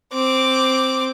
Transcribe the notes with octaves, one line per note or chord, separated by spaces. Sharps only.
C4 D6